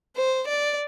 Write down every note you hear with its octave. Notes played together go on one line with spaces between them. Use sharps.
C5
D5